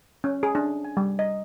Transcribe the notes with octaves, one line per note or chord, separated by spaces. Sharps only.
C#4
G#4
D4
G#5
G3
D#5